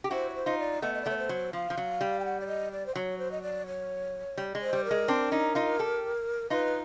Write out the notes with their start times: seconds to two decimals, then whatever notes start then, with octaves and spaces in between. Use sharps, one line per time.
0.04 G4
0.11 E4 F#4 C5
0.30 C#5
0.34 C5
0.46 D#4 F4
0.59 D5
0.82 A3 B3 D#5
0.94 D#5
1.02 D5
1.06 A3 B3 C#5
1.18 C5
1.29 F#3
1.53 F3 F5
1.70 F3
1.78 F#3
2.01 G3
2.20 G5
2.25 F#5
2.40 D5
2.47 D#5
2.72 D5
2.86 C5
2.96 F#3 C#5
3.19 C5
3.32 D#5
3.43 D5
3.67 C#5
4.38 G3
4.55 G#3
4.61 C5
4.73 G3
4.85 A#4
4.91 G#3
5.08 C4 D4
5.32 C#4 D#4
5.55 D#4 F4
5.79 G4 A4
6.50 D#4 F4 B4